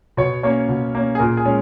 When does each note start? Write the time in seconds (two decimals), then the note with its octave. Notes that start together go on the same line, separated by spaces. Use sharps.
0.17 B2 C#5
0.43 A#3 C#4 C#5
0.69 B2
0.95 A#3 C#4
1.15 G#4
1.19 A#2 A#4
1.37 G#4
1.45 G#3 C#4